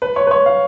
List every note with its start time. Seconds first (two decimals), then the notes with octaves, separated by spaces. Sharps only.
0.02 B4
0.16 C#5
0.27 B4
0.31 C#5
0.46 F5